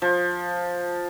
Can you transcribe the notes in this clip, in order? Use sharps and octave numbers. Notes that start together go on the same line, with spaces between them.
F3